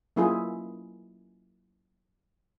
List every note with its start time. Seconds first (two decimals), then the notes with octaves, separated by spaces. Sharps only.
0.16 F#3 A#3 E4 F4 G#4